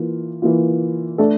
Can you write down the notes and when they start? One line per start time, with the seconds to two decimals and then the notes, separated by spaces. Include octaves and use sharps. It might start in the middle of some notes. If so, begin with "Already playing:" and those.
Already playing: E3 A#3 F4
0.42 E3 A#3 F4
1.18 A3 D4 A4